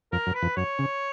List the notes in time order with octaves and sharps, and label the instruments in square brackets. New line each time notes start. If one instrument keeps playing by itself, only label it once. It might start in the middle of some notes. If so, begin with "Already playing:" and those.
[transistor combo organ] F2 [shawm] A#4
[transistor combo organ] F#2
[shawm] B4
[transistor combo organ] F2
[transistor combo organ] F#2 [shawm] C#5
[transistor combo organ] C#3